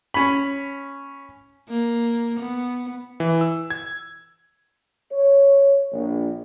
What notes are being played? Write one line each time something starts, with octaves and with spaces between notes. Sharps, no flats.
C#4 B5
A#3
B3
E3
E6
G#6
C#5
A#1